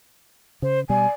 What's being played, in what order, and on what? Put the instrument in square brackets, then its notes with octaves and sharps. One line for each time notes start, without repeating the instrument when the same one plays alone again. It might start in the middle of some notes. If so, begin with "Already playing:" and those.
[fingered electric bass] C#3 [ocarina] C5
[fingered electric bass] B2 G3 [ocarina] D5 [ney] G#5